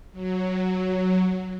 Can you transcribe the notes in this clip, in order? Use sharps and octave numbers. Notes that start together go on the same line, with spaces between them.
F#3